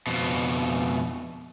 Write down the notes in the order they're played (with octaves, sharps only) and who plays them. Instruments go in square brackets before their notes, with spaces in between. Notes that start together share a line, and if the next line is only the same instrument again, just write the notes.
[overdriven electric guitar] F2 B2